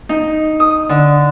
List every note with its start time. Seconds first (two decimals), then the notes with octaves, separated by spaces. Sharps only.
0.09 D#4
0.60 D#6
0.89 D3